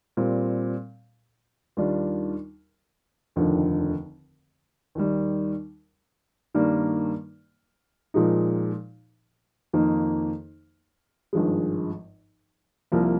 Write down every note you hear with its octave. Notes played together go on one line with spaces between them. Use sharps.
A#2 G3 C4
D#2 D#3 G3 D4 F4
F1 D#2 D3 F3
D#2 D#3 G3
G2 D#3 G3 A#3 D4
A#2 F3 G#3 D#4
F2 D#3 A#3 D#4
G#1 G2 F3 G#3
C2 C3 F3 A#3